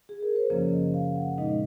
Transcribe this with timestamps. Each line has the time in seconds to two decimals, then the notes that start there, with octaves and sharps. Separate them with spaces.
0.09 G#4
0.23 A#4
0.36 C5
0.50 F#2 C#3 F3 A#3 C#4 C#5
0.72 D#5
0.94 F5
1.16 F#5
1.38 A#2 G#3 D#4 D#5